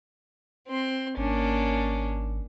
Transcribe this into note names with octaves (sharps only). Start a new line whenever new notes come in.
C4 C6
G#1 A#3 C#4 D4